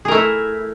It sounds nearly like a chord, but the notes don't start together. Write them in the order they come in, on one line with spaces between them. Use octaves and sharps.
G#4 A#4 A3 E4